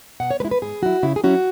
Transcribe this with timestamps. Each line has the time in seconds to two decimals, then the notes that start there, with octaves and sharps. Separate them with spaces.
0.20 B2 F#5
0.31 C#5
0.40 G#3 E4 B4
0.51 B4
0.62 G#2 G#4
0.82 F#3 E4 F#4
1.03 C#3 E4
1.16 G#4
1.24 F#3 C#4 E4 F#4